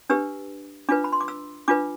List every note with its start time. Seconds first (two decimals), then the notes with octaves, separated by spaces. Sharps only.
0.10 D4 G4 B4 E6
0.89 D4 F4 B4 D6
1.04 B5
1.12 C6
1.21 D6
1.28 E6
1.68 D4 F4 B4 D6